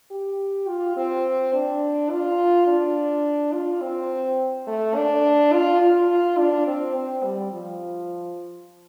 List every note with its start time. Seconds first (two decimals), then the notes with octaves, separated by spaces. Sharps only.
0.11 G4
0.68 F4
0.97 C4
1.54 D4
2.11 F4
2.67 D4
3.53 F4
3.82 C4
4.67 A3
4.96 D4
5.53 F4
5.81 F4
6.10 F4
6.38 D4
6.67 C4
6.95 C4
7.24 G3
7.52 F3